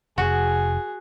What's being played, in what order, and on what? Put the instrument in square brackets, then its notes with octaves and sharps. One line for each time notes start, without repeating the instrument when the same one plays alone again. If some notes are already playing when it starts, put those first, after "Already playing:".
[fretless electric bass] F1 [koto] F#4 [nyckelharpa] G#4